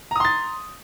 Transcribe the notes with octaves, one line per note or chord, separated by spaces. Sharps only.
A#5 C6 D#6 A6